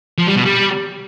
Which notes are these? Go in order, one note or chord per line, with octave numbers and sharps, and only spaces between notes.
F3
G3
B2
G3